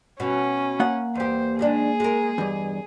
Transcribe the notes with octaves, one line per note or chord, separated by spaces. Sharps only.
B2 C#4
A#3 F#5
E2 G4 C5
D#3 G#3 D4 G#4
G#3 A#4
E2 G2 D#5